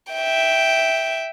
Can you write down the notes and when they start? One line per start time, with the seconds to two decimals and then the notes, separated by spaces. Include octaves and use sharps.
0.13 E5 G5